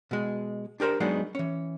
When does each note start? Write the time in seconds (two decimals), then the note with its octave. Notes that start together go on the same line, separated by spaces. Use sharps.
0.11 B2 G#3
0.80 D4 G4 A#4 C5 A#5
1.00 F#3 G#3 B3 D4 D#4 G#4
1.35 E3 C#4